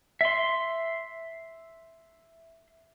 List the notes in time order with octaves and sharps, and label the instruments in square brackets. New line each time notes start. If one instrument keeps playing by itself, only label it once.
[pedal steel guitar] E5 C6